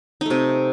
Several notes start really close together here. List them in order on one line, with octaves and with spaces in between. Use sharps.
D#4 A3 C3